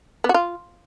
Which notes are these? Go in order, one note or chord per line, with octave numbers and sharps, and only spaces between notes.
B3
F#4
F4